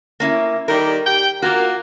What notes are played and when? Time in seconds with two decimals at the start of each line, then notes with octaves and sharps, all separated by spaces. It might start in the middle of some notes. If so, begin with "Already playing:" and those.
0.20 A#3 C#4 E4
0.68 D#3 G3 A#4
1.06 G4 G5
1.42 A#3 F4 F#4